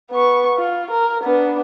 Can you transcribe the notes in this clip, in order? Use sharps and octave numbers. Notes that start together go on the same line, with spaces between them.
B3 C#6
F4
A#4
B3 D4